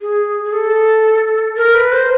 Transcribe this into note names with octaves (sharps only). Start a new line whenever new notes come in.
G#4
G#4
A4
A#4
B4
C5